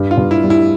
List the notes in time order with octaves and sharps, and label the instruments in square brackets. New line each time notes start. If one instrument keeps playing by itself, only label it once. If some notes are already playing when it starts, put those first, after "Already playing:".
Already playing: [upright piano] G2
[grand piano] F4
[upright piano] G2
[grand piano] E4
[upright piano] G3
[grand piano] E4